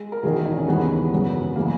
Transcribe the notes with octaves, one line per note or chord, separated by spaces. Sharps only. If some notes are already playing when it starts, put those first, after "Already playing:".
Already playing: G#3
A#4
E1 E2 D#3 G#4
D#4
C#4
D#2 C#3 E3 G#3 B3
G#1 F#2 C#3
C#3 E3 G#3 A#3